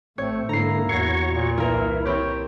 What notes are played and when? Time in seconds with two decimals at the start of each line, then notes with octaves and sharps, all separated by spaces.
0.18 A1 A3 C4 C#5
0.49 G#2 D3 A#3 E4 A#5 C7
0.89 E2 F#4 C#5 C#6 A#6 C7
1.26 A#2
1.58 C2 E3 A#3 E4 A#4
2.05 C4 G4 C#5